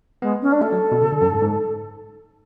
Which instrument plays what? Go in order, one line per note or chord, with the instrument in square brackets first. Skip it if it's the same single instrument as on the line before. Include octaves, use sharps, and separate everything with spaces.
[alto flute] G#3 [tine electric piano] B3
[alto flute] C#4
D4
[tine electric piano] A3 [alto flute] A4
[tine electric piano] F#3
B2
C#3
D3
F#2
G#2
G#2